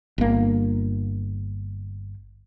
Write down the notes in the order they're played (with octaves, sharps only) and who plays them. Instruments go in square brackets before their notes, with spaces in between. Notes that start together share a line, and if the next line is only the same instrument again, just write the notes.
[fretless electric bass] G1 A#3